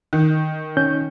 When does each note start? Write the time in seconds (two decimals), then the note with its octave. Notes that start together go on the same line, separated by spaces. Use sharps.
0.13 D#3
0.77 C#4 G6